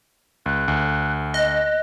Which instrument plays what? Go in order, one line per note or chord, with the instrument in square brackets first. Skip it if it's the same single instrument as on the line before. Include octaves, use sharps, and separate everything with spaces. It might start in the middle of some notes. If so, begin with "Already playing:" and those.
[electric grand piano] C#2 [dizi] F#6
[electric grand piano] D2
[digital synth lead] D#5 [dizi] F#6